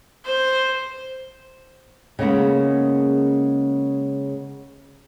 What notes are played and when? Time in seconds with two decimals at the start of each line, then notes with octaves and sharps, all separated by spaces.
0.25 C5
2.19 C#3 G#3 A#3 B3